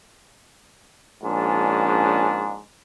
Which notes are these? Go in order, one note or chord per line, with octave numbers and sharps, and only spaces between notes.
A#1 G#2 C#4 D4 A5